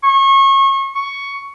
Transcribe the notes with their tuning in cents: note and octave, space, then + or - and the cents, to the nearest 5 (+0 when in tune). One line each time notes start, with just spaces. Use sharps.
C#6 -30
C#6 +5